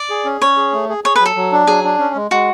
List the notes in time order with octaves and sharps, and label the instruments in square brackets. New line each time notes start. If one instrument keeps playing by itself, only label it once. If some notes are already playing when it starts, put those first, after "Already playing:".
Already playing: [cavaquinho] D5
[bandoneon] G#4
C#4
[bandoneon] C#4 [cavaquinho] C#5
[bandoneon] G#4
A3
G#4
[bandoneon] G#4 [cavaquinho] C#5
[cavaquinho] B4
[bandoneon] F#3
[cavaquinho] A4
[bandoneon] F#3
D4
[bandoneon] F#3 [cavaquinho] G#4
[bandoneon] D4
C#4
G#3
[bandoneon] G#3 [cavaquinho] F#4